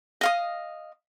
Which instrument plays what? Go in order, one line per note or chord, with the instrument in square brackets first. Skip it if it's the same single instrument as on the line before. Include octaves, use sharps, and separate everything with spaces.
[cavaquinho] D#5 F5 D#6